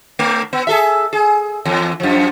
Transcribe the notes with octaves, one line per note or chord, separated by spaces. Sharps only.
A3
B3
G#4 A4 E5
G#4
E2
F#2 F3